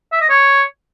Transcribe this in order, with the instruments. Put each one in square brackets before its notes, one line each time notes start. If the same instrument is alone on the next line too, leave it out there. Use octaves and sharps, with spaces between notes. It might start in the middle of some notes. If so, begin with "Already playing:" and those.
[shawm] E5
D#5
C#5